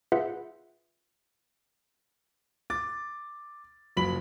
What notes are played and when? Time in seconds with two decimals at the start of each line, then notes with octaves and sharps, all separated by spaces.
0.12 F4 G#4 B4 E5 F#5
2.70 D6 A6
3.97 F#1 F3 F#3 B5 B6 F#7